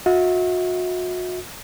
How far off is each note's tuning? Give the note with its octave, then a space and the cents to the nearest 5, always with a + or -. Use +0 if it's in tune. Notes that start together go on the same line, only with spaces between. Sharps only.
F#4 -35 E5 -35